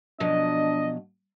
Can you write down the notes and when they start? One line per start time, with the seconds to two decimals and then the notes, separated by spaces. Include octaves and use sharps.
0.20 B2 F3 F#3 D4 D#5